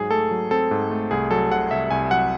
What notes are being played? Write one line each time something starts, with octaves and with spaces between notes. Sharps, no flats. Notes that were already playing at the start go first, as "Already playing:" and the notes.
Already playing: G#2 F#3 G#4
A3 A4
F#3
C4 A4
G#2
A3
C2 G#4
F#3 A4
C3 F#5
C2 E5
C2 G#5
F#3 F#5